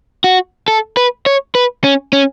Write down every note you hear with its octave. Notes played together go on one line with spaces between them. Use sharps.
F#4
A4
B4
C#5
B4
C#4
C#4